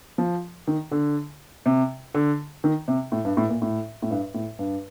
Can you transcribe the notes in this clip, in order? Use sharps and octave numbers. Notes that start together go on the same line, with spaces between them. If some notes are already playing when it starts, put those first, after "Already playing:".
F3
D#3
D3
C3
D3
D#3
C3
A2
G2
A2
A#2
A2
A2
G2
A2
G2